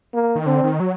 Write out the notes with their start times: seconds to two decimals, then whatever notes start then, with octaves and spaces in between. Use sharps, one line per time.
0.14 A#3
0.35 D#3
0.46 D3 C4
0.64 D#3
0.80 F#3